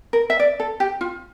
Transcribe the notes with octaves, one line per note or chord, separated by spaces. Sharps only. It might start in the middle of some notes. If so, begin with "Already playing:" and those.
A#4
E5
D5
A4
G4
F4